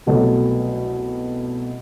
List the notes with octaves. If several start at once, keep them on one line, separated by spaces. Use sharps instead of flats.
C2 B2 F#3 A3